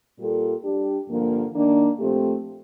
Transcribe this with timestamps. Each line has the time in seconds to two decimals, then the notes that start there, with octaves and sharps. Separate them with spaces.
0.19 A#2 G3 A#3 F4 A4
0.63 G3 D4 G4
1.08 G2 D3 F3 A#3
1.53 D#3 A#3 D4
2.00 A#2 F3 A3 C4 G4